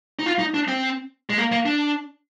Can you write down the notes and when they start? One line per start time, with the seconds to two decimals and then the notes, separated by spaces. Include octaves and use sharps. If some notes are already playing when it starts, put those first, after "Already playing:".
0.19 D#4
0.26 F4
0.39 D#4
0.54 D4
0.68 C4
1.30 G#3
1.38 A#3
1.52 A#3
1.66 D4